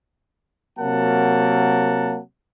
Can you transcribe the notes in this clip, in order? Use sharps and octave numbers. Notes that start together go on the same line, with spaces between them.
C3 F#3 A#3 A#4 F#5 A5